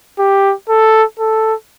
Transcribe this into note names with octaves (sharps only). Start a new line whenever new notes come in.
G4
A4
A4